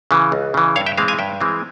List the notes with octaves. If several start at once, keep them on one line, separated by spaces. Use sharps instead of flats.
C#3 E3
C#2
C#3 E3
G2 C#5 F5
E5 G5
E3 G#3 C4 F5 G#5
F5 G#5
G2 E5 G5
E3 G#3 C4